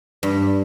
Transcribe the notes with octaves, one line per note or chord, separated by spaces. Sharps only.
G2